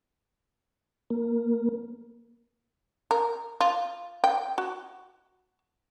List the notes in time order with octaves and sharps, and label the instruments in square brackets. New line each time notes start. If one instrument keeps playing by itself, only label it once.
[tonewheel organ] A#3
[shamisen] A#4
F4
G5
F#4